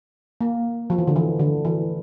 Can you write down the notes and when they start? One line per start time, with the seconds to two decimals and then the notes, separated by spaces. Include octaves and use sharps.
0.41 A#3
0.90 F3
0.98 E3
1.07 D3
1.16 E3
1.39 D3
1.65 E3